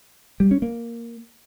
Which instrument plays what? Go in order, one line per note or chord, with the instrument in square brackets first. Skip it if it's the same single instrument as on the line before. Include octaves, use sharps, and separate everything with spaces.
[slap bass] G3
C#4
A#3